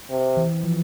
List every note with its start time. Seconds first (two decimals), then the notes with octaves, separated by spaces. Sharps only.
0.10 C3
0.37 E3
0.63 F3